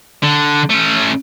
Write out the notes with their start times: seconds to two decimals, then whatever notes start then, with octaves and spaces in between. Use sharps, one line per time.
0.23 D3
0.70 A3 C#4